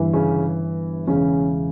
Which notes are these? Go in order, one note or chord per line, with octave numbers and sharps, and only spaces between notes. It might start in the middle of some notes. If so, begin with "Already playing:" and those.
Already playing: G1 G2 E3
C#3 C#4
E1 E2 C#3 E3 C#4